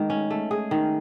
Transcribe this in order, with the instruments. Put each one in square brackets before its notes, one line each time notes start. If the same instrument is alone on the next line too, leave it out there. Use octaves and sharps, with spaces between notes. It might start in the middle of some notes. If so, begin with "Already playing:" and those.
Already playing: [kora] D#3 A3 [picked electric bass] G#3
[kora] C#4
A3
G#4
D#3